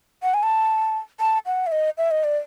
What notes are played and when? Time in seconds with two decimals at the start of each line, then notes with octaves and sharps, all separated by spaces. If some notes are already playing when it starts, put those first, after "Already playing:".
0.23 F#5
0.34 G#5
0.43 A5
1.20 A5
1.46 F#5
1.67 E5
1.72 D#5
1.98 E5
2.11 D#5
2.24 D5